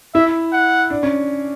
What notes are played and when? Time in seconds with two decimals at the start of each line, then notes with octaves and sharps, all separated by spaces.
0.15 E4 E5
0.53 F#5
0.90 D4
1.03 C#4